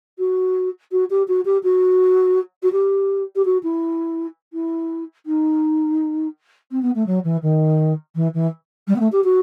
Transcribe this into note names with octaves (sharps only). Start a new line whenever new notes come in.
F#4
F#4
G4
F#4
G4
F#4
F#4
G4
G4
F#4
E4
E4
D#4
C4
B3
A3
F#3
E3
D#3
E3
E3
G3
B3
A3
G4
F#4